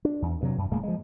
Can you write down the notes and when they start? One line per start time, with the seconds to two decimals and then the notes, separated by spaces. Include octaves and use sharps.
0.05 D4
0.22 E2
0.41 G2 C3 E3 F#3
0.58 F#2
0.71 D1 A2 G#3 A#3
0.83 F3 G#3